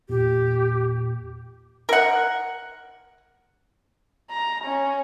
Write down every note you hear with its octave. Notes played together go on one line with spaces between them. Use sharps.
E2 A#2 G4
A#4 F#5
A#5
C#4